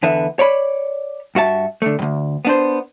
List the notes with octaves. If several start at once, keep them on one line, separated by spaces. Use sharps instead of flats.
E2 D3 B4 E5
C#5 D5 B5
G2 F#4 E5 A5
D3 A3
D2 G2
B3 D4 C5